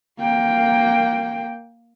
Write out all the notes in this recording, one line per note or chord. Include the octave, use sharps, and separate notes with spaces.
A#3 G5